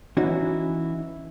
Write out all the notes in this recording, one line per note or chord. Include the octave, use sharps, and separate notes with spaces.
E3 C#4 D#4 E4 F#4